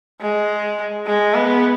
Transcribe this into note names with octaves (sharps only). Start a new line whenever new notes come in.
G#3
G#3
B3